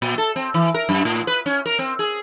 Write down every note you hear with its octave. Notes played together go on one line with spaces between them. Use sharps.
A#2
A4
C4
E3
A#4
F#2
A2
B4
C#4
A#4
C4
G#4